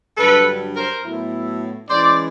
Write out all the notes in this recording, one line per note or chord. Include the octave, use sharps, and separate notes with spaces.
G2 D3 F#3 A4 B4
A#4 C5
A2 F#3 B3 E4
E3 G#3 C#4 C5 D5